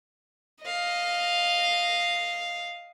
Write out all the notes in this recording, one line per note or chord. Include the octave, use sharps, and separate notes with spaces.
D#5 F5